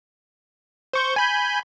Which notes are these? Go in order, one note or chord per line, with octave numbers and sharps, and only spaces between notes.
C5 C#6 G6
G#5 B5 G6